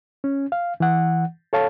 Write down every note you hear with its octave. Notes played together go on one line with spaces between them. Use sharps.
C#4
F5
E3 F#5
A4 C#5 F5 A5